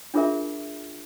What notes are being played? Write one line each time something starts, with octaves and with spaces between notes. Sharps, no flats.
D4 F4 G#4 A#4 E5